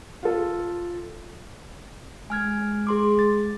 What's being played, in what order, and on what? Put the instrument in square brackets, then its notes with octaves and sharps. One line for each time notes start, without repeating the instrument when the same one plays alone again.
[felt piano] F4 A4
[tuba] G#3 [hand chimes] G#5 F6 G#6
[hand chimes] G#4 C6 D6
A6